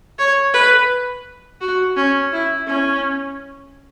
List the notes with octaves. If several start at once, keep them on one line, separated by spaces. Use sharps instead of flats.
C#5
B4
F#4
C#4
E4
C#4